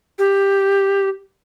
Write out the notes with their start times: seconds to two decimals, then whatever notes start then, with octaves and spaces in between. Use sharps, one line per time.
0.19 G4